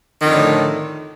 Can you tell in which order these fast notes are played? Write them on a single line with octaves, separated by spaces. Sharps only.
D#3 F2 D3 A2